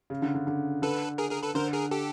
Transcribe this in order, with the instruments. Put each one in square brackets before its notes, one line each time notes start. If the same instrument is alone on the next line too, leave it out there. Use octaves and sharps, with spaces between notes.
[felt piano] C#3
D3
D3
D3
[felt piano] D3 [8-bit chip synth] A4 B4
[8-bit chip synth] G#4 A#4
G#4 A#4
A4 B4
[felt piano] D3 [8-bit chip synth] A#4 C5
[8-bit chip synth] G#4 A#4
G4 A4